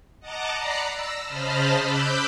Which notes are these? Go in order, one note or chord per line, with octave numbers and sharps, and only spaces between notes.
D#5 F#5 A5 A#5 D6
D5 A#5 B5 F#6 C7 C#7
E6 A#6
C#3 C5 D#5 A5 B5 F6
B5 D6 E6 F#6 G6